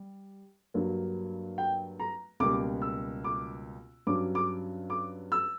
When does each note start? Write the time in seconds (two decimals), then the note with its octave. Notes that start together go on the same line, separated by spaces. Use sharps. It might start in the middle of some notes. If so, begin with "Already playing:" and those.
Already playing: G3
0.74 G2 F#3 A#3
1.58 G5
2.00 A#5
2.40 C#2 B2 G3 A#3 D6
2.82 E6
3.24 D6
4.07 G2 F#3 C#4 D6
4.35 D6
4.90 D6
5.32 E6